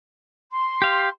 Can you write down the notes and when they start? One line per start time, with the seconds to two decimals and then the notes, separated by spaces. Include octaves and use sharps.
0.53 C6
0.82 G4 F5